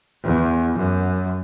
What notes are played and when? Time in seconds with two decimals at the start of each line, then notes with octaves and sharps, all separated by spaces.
0.24 E2
0.78 F#2